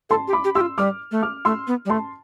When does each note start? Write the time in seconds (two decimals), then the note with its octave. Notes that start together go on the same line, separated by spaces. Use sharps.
0.10 A4 A5 C6
0.28 G4
0.33 B5 D6
0.44 G4
0.55 G4 C6 E6
0.61 F4
0.78 G3 D6 F6
1.11 A3
1.22 D6 F6
1.45 A3 C6 E6
1.67 B3
1.85 G3
1.89 A3 A5 C6